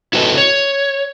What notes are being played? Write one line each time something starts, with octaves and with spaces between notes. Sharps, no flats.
E4 F#4 A4 B4 C#5 D#5
C#5